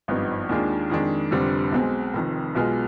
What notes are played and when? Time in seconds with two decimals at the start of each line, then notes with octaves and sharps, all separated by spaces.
0.08 G#1 G2 F3 B3 D#4
0.49 D#2 D#3 G#3 D4 F4
0.90 F2 D#3 G#3 D4
1.31 F1 F2 D3 G3 C4
1.72 B1 B2 G#3 C4
2.13 F1 F2 D#3
2.55 B1 B2 G#3 B3 F4